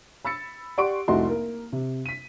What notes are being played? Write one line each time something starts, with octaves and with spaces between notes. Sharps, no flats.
B5 E6 A6 C#7
G4 D5 F#5 C6 C#6 D7
F1 C2 A3 F#4 D#5 C6
A#3
C3
B6 D#7